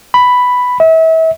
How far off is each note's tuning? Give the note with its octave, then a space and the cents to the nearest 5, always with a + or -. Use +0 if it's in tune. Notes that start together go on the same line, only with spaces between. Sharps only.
B5 +5
E5 -35